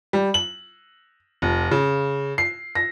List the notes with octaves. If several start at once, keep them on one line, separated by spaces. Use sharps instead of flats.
G3
F#7
F1
C#3
C7
A#6